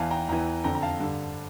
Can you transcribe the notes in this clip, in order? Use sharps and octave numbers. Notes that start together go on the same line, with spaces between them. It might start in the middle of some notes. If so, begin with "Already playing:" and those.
Already playing: E2 E3 F5 A5
G5 A#5
E2 E3 G5 A#5
F2 D3 G5 A#5
A#5
F5 A5
G2 D3